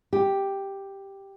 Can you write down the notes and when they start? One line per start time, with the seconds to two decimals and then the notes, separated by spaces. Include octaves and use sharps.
0.13 G4